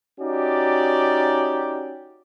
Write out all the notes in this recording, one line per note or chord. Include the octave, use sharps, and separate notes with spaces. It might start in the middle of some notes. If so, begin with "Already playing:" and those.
C#4 D#4 F#4 G4 D5